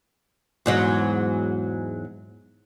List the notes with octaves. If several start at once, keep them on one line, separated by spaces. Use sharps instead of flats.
E2 G#2 F#3